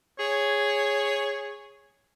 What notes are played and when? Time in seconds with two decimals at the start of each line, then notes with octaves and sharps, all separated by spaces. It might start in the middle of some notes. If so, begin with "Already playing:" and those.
0.19 G#4 C#5